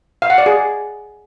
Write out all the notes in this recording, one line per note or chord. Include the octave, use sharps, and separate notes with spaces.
F5
F#5
D5
G#4